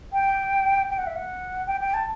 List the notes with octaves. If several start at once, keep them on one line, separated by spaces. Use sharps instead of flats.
G5
G5
F#5
E5
F#5
G5
G5
A5